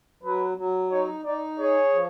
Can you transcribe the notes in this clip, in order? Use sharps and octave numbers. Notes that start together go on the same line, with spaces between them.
F#3 B4
F#3
D#4 C#5
D#4 D5
G#4 C#5
F3